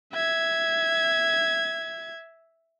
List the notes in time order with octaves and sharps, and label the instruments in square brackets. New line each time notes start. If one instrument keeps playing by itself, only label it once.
[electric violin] E5 G#6